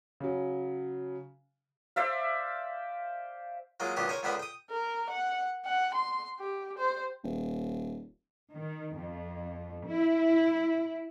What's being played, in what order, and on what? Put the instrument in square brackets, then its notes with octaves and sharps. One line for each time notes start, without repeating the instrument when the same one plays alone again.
[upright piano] C#3 F#3
[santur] C5 D5 E5 F5
[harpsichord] F#3 G#3 A#3 F4
C#2 B2 D#3 D4 F#4 G4
A#4 C5 C#5 G5 G#5
C#2 D3 B3 D4 A#4 B5
G5 D#6
[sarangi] A#4
F#5
F#5
C6
G4
C5
[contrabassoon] D#1
[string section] D#3
F2
E4